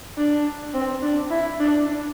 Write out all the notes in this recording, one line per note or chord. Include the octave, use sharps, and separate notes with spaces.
D4
C4
D4
E4
D4